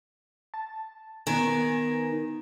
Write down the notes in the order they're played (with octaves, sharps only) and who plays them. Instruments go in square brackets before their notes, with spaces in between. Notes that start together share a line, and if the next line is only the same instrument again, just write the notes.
[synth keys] A5
[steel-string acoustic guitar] D#3 [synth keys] B3 G#5